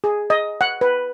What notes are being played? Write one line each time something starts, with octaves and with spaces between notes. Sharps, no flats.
G#4
D#5
F#5
B4